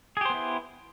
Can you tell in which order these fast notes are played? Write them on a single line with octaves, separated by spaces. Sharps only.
G#4 G4 C5 B3 E4